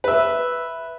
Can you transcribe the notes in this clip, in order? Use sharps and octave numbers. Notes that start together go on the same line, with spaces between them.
B4 E5